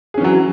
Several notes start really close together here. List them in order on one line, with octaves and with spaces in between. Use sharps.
G#4 C#4 E3 F#3